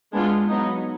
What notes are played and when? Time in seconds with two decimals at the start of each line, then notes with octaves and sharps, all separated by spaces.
0.12 G#3 B3 D4 F4
0.49 F#3 B3 D#4